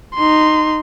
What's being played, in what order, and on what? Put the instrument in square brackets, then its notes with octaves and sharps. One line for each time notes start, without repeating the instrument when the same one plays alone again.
[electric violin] D#4 C6